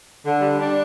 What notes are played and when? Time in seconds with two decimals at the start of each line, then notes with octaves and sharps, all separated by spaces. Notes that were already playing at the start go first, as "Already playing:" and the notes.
0.24 D3
0.41 G3
0.59 D4